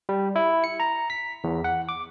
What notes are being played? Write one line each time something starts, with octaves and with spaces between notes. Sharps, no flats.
G3
E4
C#7
A#5
B6
E2
F#5
D6